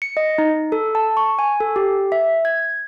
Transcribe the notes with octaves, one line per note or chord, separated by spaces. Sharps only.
C#7
D#5
D#4
A4
A5
C#6
G#5
A4
G4
E5
G#6